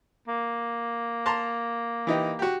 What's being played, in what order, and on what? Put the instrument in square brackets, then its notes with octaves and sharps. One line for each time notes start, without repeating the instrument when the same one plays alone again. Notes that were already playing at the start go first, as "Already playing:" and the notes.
[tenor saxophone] A#3
[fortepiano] A5 A#5 C6
E3 D#4 G4
F#4 G4